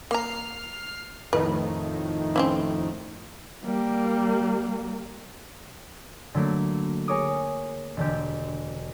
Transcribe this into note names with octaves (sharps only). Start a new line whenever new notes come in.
A#3 A#5 F6 C7
F2 A2 D#3 B4
C4 C#4 E4
G3 A#3
D3 F#3 A3 A#3
G#4 A#4 C#5 D6 D#6
E1 D3 G4